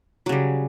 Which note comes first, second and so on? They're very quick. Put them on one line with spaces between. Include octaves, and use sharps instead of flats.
F#3 C#3 G3